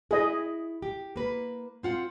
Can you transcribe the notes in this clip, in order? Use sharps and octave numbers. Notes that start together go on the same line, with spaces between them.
E4 G#4 D#5
G4
A#3 B4
C4 F4 F#5